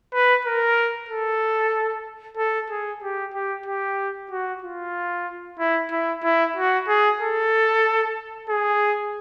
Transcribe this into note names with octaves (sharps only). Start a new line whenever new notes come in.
B4
A#4
A4
A4
G#4
G4
G4
G4
F#4
F4
E4
E4
E4
F#4
G#4
A4
G#4